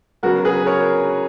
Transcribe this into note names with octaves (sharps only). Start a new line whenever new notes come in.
C#3 F#3 B3 F#4 A#4
G#4 B4
A#4 C#5